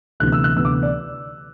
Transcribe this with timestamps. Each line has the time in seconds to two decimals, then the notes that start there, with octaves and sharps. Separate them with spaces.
0.20 D2 C3 E3 B3 F#6
0.32 E6
0.44 F#6
0.56 D2 C3 E3 B3 E6
0.65 D6
0.83 D5